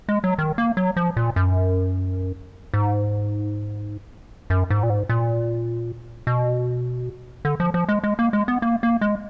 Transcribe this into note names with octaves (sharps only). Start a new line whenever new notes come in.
G#3
F#3
D#3
A#3
F#3
F3
A#2
F#2
G#2
F#2
G#2
A#2
G#2
A#2
B2
D3
F3
F3
G#3
G#3
A#3
G#3
B3
A#3
A#3
G#3